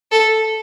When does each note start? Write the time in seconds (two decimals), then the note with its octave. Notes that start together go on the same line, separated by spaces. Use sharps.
0.12 A4